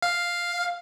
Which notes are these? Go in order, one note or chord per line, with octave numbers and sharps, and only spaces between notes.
F5